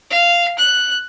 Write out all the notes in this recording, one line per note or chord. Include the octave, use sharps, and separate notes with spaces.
F5
F#6